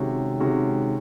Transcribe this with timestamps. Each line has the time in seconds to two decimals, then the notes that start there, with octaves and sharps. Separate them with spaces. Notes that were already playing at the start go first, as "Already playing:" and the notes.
Already playing: C3 D#3 G#3 C#4 F#4
0.40 C3 D#3 G#3 C#4 F#4